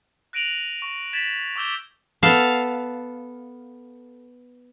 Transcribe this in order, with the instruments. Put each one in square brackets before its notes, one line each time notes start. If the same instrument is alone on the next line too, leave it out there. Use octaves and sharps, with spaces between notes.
[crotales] F#6 A#6 D7 D#7 F7 F#7
C#6
G#6 A6 B6 E7 F#7
C#6 D6 E6 G6 G7
[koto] B3 A4 F5